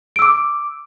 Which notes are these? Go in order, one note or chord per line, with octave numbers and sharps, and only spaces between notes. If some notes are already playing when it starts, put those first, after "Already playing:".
D6 E6 D7